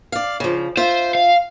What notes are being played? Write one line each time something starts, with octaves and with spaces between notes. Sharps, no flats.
D5 F5
C#3 F3
F4 C5 E5
F5